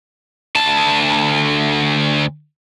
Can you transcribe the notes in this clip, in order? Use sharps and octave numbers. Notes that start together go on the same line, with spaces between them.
D2 A5